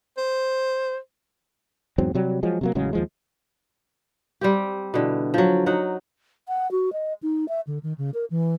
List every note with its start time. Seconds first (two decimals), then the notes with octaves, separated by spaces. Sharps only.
0.18 C5
1.98 E2 G#2 F#3 C4
2.15 C3 F#3 G3
2.43 F3 F#3 G#3
2.61 C3 F#3 A#3
2.75 A1 C#3 F#3 G#3
2.93 D#2 F3 G#3
4.41 G3 C4 G4
4.94 B2 D3 E3
5.34 F3 F#3
5.66 F#3 D#4 F#5
6.48 F#5
6.71 F#4
6.93 D#5
7.23 D#4
7.48 E5
7.67 D3
7.83 D#3
7.98 C#3
8.14 A#4
8.31 E3